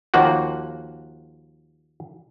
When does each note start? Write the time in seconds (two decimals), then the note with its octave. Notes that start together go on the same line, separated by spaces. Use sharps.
0.14 D#2 F3 A#3 F#4 F#5